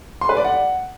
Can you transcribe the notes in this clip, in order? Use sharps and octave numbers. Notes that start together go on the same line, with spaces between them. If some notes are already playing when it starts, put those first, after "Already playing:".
C6
B4
D5
F#5